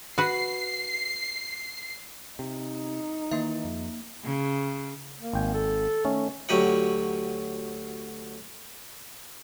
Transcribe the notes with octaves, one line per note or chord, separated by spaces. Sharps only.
F#4 B4 C7
C3 D#4
D#3 E3 A#3 E5
F2
C#3
A#3
G#1 G5 G#5
A4
D#3 A3 C#4
D2 F#3 G4 D#5 F#5